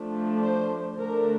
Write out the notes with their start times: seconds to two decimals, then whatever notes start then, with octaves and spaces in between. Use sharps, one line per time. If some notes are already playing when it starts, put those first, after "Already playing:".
Already playing: F3 A3 D4
0.44 C5
0.97 D3 A3 D4 A#4